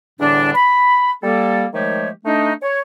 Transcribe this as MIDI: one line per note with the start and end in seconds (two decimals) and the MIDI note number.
0.20 0.51 40
0.20 0.51 45
0.20 0.51 50
0.20 0.51 55
0.20 0.51 62
0.55 1.10 83
1.23 1.66 55
1.23 1.66 58
1.23 1.66 69
1.74 2.09 51
1.74 2.09 53
1.74 2.09 56
1.74 2.09 57
1.74 2.09 67
1.74 2.09 73
2.25 2.52 57
2.25 2.52 62
2.25 2.52 63
2.62 2.80 73